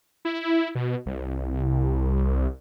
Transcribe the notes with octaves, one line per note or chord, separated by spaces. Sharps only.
E4
B2
C2